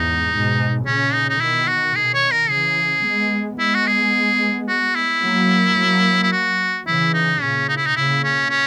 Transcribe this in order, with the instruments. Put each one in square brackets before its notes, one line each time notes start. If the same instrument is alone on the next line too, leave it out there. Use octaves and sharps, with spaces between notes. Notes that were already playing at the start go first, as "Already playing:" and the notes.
Already playing: [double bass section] E2 G#2 [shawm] D#4
[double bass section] G#2 B2
[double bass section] A#2 C#3 [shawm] C#4
[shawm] D#4
D#4
[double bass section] B2 D#3 [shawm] E4
[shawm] F#4
[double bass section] B2 D#3 [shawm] G#4
[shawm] C#5
A#4
[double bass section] C#3 E3 [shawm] G#4
[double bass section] G#3 B3
[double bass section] G#3 B3 [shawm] E4
[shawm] F#4
G#4
F#4
E4
[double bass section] F#3 A#3
F#3 A#3
[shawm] E4
F#4
[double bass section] C#3 E3 [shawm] E4
[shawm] D#4
[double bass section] A#2 C#3 [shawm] C#4
[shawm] D#4
E4
D#4
[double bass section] A#2 C#3 [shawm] E4
[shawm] C#4
C#4